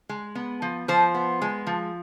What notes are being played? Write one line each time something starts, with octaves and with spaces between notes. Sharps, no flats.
G#3
B3
F3
F3 C5
B3
G#3
F3